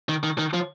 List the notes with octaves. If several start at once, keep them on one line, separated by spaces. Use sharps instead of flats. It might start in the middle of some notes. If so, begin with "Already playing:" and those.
D#3
D#3
D#3
F3